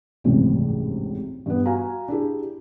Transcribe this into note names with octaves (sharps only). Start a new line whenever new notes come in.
G#1 C#2 F#2 A2 C3 E3
G2 B3
F#4 F5 G#5 A#5
D4 E4 G4 G#4